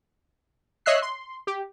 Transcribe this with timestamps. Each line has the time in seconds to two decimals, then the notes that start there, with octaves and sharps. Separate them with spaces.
0.86 C#5 D#5 E5 E6 F#6 C7
1.02 C6
1.47 G4